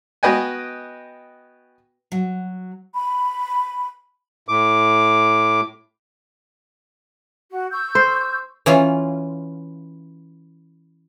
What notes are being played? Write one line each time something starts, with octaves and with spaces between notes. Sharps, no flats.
B3 F#4 B4 D#5 G5 G#5
F#3
B5
A2 D6
F#4
C#6 E6 G6
C5
E3 C#4 F4